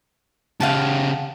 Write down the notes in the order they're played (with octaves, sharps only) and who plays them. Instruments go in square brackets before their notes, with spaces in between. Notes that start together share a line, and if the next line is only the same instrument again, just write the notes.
[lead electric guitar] C#3 G4 [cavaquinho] F5 F#5 A5